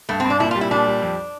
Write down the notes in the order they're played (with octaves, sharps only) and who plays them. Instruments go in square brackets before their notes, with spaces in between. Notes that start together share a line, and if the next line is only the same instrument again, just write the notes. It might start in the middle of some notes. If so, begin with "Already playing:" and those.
[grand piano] G2 [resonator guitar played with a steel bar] A3
[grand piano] G2 [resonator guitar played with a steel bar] C4
[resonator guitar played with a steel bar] D4
[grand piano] A#2 [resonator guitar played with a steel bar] E4
[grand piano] G3 [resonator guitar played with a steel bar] F4
[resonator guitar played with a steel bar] E4
[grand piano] A#2 [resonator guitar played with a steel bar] D4
[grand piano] G3
F2